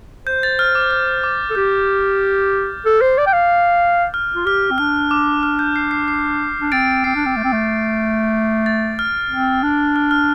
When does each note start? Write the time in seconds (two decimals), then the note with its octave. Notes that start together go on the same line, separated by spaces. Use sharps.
0.27 C5 G6
0.43 A6
0.59 F6
0.75 D6
0.91 F6
1.24 D6
1.50 A4
1.55 G4 G6
2.85 A4
3.01 C5
3.18 D5
3.26 G5
3.33 F5
4.14 F6
4.35 F4
4.46 G4 F6
4.71 C4
4.78 D4 F6
5.11 D6
5.43 F6
5.59 G6
5.76 C7
5.91 C7
6.08 C7
6.61 D4
6.72 C4 A6 D7
7.04 C4 C7
7.15 D4
7.26 C4
7.37 A3
7.44 C4
7.53 A3
8.66 A6
8.99 F6
9.30 C4
9.63 D4
9.96 F6
10.11 F6